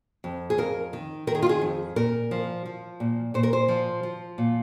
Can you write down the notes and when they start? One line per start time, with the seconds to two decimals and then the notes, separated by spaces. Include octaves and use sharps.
0.24 F2
0.50 G#4
0.58 F2 A#4
0.93 D#3
1.27 D#3 A#4
1.35 G#4
1.42 F4
1.49 G#4
1.61 F2
1.96 A#2 A#4
2.31 F3
2.66 F3
3.00 A#2
3.34 A#2 C5
3.43 A#4
3.53 C5
3.68 F3
4.03 F3
4.38 A#2